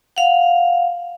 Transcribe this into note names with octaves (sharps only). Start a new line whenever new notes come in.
F5 F#5